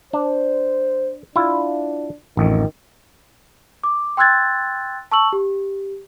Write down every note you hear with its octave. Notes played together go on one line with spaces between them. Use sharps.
D4 C5
D4 E4 F4
A1 F2 D#3
D6
G5 C6 E6 F#6 G#6 A6
A5 C#6 E6 F#7
G4